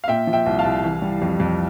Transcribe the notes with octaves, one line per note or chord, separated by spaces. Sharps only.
F5
A#2 E5 G5
F3
E5 G5
C2
F5 A5
C2
E3
G3
F2
F2